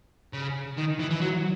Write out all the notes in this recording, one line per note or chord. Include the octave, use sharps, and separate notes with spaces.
C#3
D#3
E3
E3
F#3